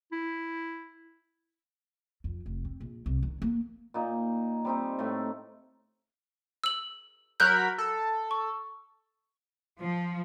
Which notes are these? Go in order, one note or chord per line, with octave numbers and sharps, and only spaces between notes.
E4
F2
F1
C4
A#1
C2
D#3
A#3
A#2 D#4
G3 C4 D#4
A2 A3
E6 F#7
F#3 A#4 B5 F#6 G6
A4
C#6
F3